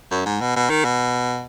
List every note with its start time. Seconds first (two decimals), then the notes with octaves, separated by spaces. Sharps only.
0.11 F#2
0.26 G#2
0.41 B2
0.56 B2
0.70 D#3
0.85 B2